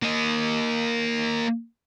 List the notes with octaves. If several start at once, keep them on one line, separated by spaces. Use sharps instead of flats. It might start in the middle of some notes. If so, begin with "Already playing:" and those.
A#3 D#5